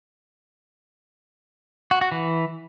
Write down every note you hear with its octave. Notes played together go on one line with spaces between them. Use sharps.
F#4
F#4
E3